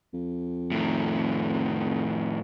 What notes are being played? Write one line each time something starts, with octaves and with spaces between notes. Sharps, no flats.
F2
A2 D#3